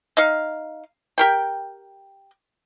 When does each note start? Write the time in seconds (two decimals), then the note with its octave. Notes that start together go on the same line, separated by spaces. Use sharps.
0.17 D#4 F5
1.18 G4 A#4 G5